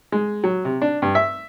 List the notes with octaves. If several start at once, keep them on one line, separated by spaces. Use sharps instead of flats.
G#3
F#3
C3
D4
G2
E5